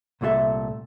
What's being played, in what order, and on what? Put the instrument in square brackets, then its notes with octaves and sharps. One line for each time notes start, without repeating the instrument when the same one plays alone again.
[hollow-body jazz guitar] C2 A#2 A3 F4 A4 E5